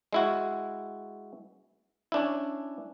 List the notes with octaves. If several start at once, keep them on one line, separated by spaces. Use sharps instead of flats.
G#3 E4 F#4
C#4 D4 E4